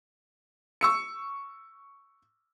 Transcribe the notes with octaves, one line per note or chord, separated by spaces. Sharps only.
C#6 E6 C#7